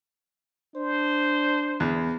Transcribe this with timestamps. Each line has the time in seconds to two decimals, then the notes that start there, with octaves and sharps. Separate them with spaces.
0.76 D4 C5
1.80 E2